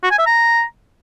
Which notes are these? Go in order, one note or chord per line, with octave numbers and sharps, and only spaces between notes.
F#4
G#5
E5
A#5